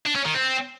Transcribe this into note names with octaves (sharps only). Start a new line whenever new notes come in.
D4
C#4
D#3
C4